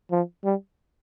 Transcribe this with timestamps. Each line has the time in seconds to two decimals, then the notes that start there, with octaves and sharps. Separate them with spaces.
0.11 F3
0.44 G3